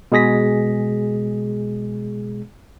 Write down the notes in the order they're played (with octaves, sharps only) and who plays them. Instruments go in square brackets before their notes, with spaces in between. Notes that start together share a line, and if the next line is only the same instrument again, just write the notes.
[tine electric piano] B2 G#3 G#4 A#6 B6